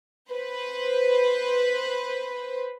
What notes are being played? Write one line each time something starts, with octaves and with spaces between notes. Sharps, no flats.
B4 C5